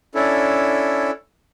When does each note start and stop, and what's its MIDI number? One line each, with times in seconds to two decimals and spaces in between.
0.15 1.11 61
0.15 1.11 62
0.15 1.11 64
0.15 1.11 69